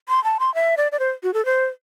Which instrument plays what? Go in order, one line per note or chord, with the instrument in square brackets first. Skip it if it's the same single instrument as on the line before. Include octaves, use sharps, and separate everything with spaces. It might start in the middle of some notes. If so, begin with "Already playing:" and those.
[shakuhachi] C6
A5
C6
E5
D5
D5
C5
F#4
A4
C5